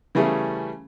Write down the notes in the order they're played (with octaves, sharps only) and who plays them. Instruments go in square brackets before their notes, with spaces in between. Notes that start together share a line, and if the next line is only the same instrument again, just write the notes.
[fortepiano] C#3 E3 G3 A3 C#4 G#4